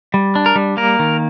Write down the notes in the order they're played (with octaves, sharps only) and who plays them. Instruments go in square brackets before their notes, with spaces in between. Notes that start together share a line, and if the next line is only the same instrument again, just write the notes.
[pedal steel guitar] G3
D4
A#4
G3
A#3 A#4
D#3